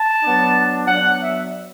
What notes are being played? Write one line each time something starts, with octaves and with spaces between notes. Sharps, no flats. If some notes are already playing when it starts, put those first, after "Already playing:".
Already playing: A5
F#3 B3 D4
F#3 B3 D4 F#5
E5